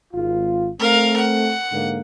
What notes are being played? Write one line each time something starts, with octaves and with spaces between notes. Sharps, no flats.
G#1 F4
A3 C4 A#4 F5
F#5
G#2 D3 A#3